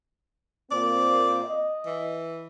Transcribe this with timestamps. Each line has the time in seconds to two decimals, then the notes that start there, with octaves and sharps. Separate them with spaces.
0.71 A#2 A#3 C4 D5
1.44 D#5
1.86 E3